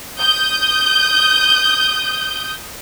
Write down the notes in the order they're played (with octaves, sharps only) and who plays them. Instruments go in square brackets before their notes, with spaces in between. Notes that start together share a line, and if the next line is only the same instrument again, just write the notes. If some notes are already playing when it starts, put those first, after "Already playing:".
[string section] D#6 G6